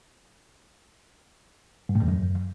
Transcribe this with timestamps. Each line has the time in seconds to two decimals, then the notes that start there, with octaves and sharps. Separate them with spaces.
1.89 G2
1.96 A2
2.02 E2
2.08 F#2